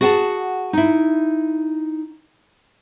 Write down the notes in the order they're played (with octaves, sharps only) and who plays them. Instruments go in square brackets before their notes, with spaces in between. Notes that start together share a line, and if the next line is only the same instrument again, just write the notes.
[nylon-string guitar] F#4 G#4 F#5 G#5 A5
D#4 E4